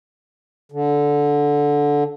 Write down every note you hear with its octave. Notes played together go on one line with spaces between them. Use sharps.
D3